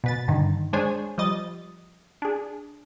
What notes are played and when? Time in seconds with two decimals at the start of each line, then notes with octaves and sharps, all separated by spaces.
0.04 B2 B4 A6
0.28 G2 D3 D#3
0.73 G#3 D4 G#4 C5 C#5 G#5
1.18 F3 G3 D#5 A6
2.22 D4 G#4